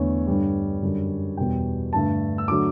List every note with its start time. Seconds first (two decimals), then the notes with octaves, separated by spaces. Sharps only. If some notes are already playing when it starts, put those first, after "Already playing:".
Already playing: E2 D3 A3 C#5
0.27 G2 D3 G3
0.82 F#2 D3 G3
1.37 E2 B2 G3 G5
1.93 G2 D3 A3 A5
2.38 E6
2.48 D3 F#3 A3 D6